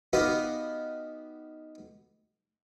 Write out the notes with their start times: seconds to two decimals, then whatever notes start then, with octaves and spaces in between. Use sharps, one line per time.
0.13 B3 D#4 F#4 G4 B4 F5